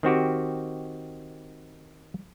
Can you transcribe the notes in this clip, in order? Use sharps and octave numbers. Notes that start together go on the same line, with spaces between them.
D#3 C4 F#4 G4